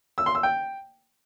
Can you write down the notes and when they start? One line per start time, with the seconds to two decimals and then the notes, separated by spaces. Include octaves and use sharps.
0.18 E6
0.26 C6
0.35 E6
0.43 G5